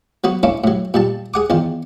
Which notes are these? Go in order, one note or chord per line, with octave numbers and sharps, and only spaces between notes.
F#3 B3 F#4
A#3 C#4 D4 E4
A2 F#3
A#2 G3 A5
G#4 F#5 D6
E2 D#3 F4